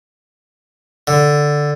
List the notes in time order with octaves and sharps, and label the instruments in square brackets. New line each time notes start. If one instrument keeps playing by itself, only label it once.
[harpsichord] D3